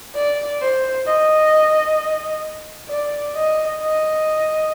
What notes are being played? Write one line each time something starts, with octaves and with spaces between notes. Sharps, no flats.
D5
C5
D#5
D5
D#5
D#5